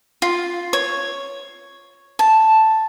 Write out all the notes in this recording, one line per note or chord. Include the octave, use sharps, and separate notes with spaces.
F4
C#5
A5